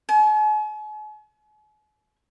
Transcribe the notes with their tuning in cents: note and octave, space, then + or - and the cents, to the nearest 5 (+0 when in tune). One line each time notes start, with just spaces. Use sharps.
G#5 +45